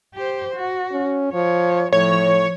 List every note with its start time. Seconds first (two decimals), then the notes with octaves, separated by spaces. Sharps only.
0.15 G4 C5
0.56 F#4
0.92 C#4
1.33 F3 C#5
1.93 A2 F3 C#5